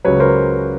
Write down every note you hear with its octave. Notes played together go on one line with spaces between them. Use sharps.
C#2 C#3 F#3 B4 C#5
A#4 C5